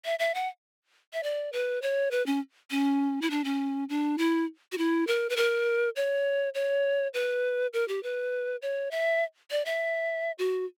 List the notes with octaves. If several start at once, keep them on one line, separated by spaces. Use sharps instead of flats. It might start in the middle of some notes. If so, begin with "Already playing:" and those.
E5
E5
F#5
E5
D5
B4
C#5
B4
C#4
C#4
E4
D4
C#4
D4
E4
F#4
E4
A#4
B4
A#4
C#5
C#5
B4
A#4
G4
B4
C#5
E5
D5
E5
F#4